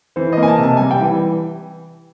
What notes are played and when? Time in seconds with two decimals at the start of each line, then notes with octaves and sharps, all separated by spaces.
0.16 E3 C5
0.33 A#3 D#5
0.43 G#5
0.48 A5
0.58 C3
0.63 A5
0.77 G3 G#5
0.91 G5
1.00 E3